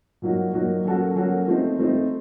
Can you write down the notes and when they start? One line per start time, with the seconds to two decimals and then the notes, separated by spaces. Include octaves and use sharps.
0.22 A#2 F#3 A#3 D#4 F#4
0.53 A#2 F#3 A#3 D#4 F#4
0.85 F#3 A#3 C#4 F#4 A4
1.16 F#3 A#3 C#4 F#4 A4
1.47 F3 A3 C4 D#4
1.79 F3 A3 C4 D#4